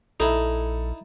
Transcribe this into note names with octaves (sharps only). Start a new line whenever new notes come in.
A#1 D#4 E4 A4